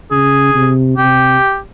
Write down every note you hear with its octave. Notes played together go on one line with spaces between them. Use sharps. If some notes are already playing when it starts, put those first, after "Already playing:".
C#3 G#4
C3
C3 G4